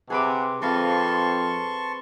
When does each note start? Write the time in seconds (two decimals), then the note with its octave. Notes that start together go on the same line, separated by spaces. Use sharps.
0.10 C3 G#4 B4 F#5 D6
0.62 F2 C4 B4 F5 A5 C6 C#6